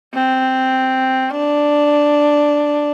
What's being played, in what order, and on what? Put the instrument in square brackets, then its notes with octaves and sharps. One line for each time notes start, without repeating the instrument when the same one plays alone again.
[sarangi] C4
D4